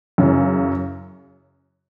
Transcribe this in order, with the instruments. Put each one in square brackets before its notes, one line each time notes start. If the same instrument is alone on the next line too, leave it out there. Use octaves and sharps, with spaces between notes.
[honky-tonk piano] F#2 C#3 E3